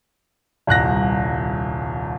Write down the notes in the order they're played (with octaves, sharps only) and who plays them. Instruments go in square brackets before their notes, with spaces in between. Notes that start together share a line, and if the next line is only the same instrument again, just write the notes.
[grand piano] D#1 C2 F#6 A#6